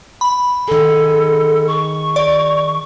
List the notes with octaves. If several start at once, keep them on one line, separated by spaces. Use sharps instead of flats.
B5
D#3 G#4 A4
C#6
D5